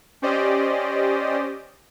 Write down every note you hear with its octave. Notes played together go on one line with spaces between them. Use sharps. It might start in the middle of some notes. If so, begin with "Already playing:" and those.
C#4 G4 C5 D5 D#5